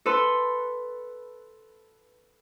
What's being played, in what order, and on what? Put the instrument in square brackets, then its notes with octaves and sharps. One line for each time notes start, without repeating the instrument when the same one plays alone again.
[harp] A4 B4 C6